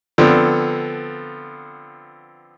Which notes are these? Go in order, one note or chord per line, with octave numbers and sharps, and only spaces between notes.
D3 F3 B3 C4